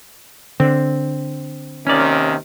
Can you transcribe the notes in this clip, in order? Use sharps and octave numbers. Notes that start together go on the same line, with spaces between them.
D3 C4
D#2 C3 D#3 C#4 D5